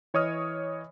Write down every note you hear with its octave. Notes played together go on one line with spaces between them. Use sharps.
E3 C#5 D#5 D#6 F6